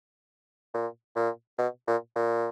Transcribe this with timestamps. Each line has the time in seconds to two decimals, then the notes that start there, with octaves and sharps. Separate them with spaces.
0.74 A#2
1.16 A#2
1.59 B2
1.87 A#2
2.16 A#2